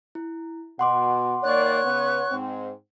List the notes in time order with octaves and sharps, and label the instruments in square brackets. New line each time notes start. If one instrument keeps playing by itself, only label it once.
[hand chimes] E4
[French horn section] B2 [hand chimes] F#5 C6 D6
[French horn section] D#3 A#3 D5 [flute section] C#5 C#6 F#6
[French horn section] C#3 B3
G#2 C4